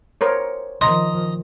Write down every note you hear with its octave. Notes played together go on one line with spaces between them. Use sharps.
A#4 C5 C#5
D#3 F3 D#5 A#5 C6